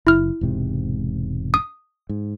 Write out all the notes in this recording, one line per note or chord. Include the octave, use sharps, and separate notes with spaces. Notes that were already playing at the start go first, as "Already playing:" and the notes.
F#1 E4 F6
E1 G#2 C3
D#6
G#2